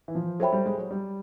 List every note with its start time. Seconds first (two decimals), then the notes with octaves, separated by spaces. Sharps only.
0.08 E3
0.15 F3
0.40 F#3 A4 C5 E5 G5 B5
0.53 G3
0.66 G#3
0.78 F#3
0.91 G3